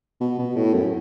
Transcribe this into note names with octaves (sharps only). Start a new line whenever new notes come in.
B2
B2
A2
F#2